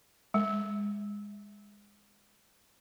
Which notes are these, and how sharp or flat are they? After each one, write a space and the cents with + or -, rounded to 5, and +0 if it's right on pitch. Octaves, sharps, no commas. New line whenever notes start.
G#3 -20